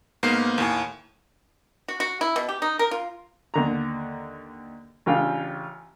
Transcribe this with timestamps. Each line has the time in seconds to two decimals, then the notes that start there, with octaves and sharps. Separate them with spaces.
0.23 G#2 A#3 B3 F6 C7
0.58 D#2 A2 G#5
1.88 F#4
2.00 F#4
2.21 E4
2.36 B2
2.49 G4
2.62 D#4
2.79 A#4
2.91 F4
3.54 D#2 D3 A#5
5.06 A1 C#3 D4 F4 F5 G5